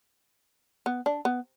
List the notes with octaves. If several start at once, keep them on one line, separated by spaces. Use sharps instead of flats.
B3
D4
B3